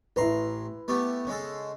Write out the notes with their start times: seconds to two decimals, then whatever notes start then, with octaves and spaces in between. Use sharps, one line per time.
0.16 A1 E4 B4 A#5 C6
0.88 A3 B3 G4
1.27 C#3 G#3 A4